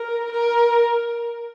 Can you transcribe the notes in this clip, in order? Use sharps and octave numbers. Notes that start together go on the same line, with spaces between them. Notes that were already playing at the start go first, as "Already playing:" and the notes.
Already playing: A#4
A#4